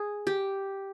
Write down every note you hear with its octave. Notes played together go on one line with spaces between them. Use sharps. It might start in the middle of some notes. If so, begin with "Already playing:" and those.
Already playing: G#4
G4